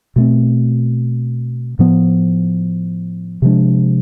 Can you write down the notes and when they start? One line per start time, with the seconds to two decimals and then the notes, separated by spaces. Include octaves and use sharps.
0.16 B2 A3 C4
1.79 A2 F3 B3
3.42 C3 F3 G#3 D4